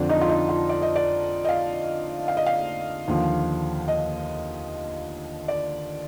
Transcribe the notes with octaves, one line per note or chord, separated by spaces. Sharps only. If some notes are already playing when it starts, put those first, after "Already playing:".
Already playing: F2 D3 F3 D4
D#4
F4
D#4
F4
D5
D#5
D5
D#5
F5
F5
D#5
F5
D#2 D3 F3
D#5
D5